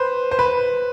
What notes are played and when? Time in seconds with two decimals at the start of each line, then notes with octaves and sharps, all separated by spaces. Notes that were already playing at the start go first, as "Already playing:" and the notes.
Already playing: B4 C5
0.31 C5
0.39 B4